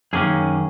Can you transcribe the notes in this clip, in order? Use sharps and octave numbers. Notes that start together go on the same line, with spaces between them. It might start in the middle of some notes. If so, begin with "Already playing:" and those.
F#2 D#3 A#3 C#4 G#4